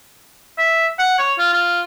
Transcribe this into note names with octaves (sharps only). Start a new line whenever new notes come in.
E5
F#5
C#5
F4
F4